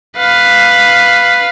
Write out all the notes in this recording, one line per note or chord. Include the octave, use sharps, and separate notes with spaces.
B4 F5